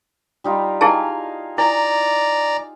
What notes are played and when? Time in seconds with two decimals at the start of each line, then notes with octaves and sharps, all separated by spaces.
0.44 G3 D#4 F4
0.81 D#4 E4 G#4 F5 G#5 A5
1.58 E4 D5 G#5 A#5